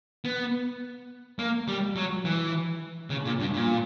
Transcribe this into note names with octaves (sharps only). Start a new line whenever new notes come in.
B3
A#3
G3
F#3
E3
C#3
A#2
G2
A#2